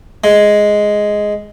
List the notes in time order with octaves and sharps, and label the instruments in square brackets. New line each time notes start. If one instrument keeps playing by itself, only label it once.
[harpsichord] G#3